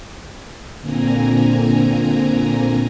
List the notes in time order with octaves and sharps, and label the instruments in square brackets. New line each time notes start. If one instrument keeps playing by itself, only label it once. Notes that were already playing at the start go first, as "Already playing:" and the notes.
[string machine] A#2 D3 A#3 C4 G#5 A#5